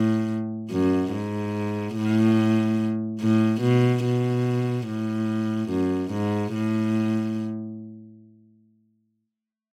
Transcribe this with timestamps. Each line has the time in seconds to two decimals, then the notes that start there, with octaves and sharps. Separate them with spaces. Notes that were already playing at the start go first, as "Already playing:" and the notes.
Already playing: A2
0.72 F#2
1.13 G#2
1.96 A2
3.21 A2
3.62 B2
4.04 B2
4.87 A2
5.70 F#2
6.12 G#2
6.53 A2